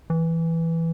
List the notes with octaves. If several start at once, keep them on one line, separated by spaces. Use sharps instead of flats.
E3